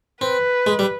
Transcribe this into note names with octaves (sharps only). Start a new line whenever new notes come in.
C4 B4
G#3
G3